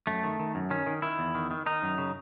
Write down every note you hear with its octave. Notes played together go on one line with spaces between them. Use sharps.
F#2 A3
D#3
D#3
F#2
D#3 C#4
D#3
D#3 E4
E2
D#3
D#3
D#3 D#4
F#2
C#3